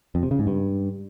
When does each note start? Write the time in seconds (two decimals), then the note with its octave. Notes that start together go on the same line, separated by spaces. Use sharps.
0.15 F2
0.23 C3
0.31 C#3
0.39 G#2
0.47 G2